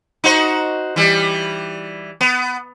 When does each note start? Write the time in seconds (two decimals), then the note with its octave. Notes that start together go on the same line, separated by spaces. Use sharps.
0.24 D#4 F#4 C5
0.96 E3 G3
2.21 B3